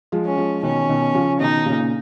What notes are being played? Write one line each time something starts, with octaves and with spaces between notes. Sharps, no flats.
F3 G#3
C#4
F3 G#3
B2 D#3 C#4
B2 D#3
C#3 F3
B2 D#3 D#4
A#2 C#3